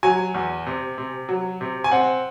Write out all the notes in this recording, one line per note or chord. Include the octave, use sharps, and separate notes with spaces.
F#3 G#5
E2
C3
C3
F#3
C3
G#5
C4 F#5